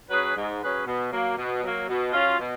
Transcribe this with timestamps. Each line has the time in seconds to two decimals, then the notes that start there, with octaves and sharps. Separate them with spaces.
0.09 F#3 C#4 G#4 B4
0.35 G#2
0.60 F#3 C#4 G#4 B4
0.85 B2
1.11 F#3 A#3
1.36 B2
1.62 F#3 A#3
1.88 B2
2.12 F#3 C#4 F4
2.39 B2